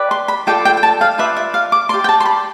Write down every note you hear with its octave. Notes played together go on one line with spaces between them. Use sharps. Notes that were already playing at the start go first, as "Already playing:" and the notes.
Already playing: G4 B4 D5
C6
B5
F4 A4 D5 G5
G5
G5
A5
F5
F4 B4 D5 E5
E5
F5
D6
G4 D5 C6
G5
A5
C6
B5